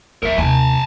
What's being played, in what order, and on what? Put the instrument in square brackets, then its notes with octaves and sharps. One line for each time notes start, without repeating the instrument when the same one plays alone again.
[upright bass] D#1 A#3 [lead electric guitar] A#4 E5
[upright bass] D#2 C3 [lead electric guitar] G#5 A5